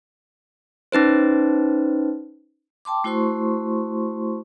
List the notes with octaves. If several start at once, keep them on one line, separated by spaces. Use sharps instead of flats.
C#4 D#4 B4 C5
G5 A5 C6 D6
A3 E4 F#4 C5 C6 C#6